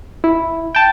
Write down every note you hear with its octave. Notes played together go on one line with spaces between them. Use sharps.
E4
G5 A5